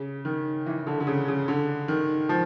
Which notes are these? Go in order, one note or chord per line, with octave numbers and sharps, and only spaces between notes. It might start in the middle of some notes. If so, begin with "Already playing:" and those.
Already playing: C#3
D#3
E3
D3
D3
C#3
C#3
D3
D#3
F3